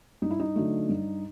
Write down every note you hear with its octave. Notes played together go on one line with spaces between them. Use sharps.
G2 D#4
E4
D#4
D3 F#3 A3
G2